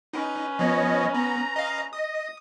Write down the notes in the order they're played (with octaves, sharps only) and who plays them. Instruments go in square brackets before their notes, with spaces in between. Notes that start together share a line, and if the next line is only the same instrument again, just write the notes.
[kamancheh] C#4 B4 [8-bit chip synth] D#4
[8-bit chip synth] F3 B3 [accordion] C#5 D#5
[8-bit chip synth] B3 [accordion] A#5
[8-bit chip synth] D#5 F5
[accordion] D#5 [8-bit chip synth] D#6